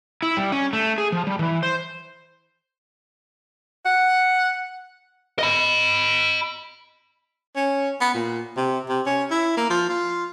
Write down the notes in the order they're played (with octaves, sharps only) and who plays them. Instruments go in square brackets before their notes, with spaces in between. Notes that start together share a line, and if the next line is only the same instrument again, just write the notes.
[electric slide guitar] E4
G3
C#4
A3
G#4
F3
G3
E3
C5
[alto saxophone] F#5
[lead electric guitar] D#5 B5
[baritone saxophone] C#4
B3
A#2
C3
C3
C#4
E4
A#3
F3
F4